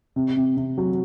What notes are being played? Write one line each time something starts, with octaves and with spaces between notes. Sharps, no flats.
C3
C3
C3
F#3